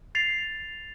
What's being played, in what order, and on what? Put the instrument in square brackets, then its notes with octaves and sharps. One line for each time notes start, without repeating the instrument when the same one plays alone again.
[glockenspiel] A6 C7 F7